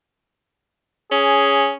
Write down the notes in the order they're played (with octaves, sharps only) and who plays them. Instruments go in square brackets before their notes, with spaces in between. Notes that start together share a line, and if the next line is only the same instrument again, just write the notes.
[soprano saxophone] C#4 [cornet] G#4